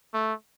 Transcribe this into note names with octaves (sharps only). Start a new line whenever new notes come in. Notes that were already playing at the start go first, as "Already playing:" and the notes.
A3